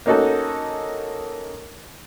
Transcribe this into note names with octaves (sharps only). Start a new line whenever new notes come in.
A#3 C#4 D#4 F#4 A4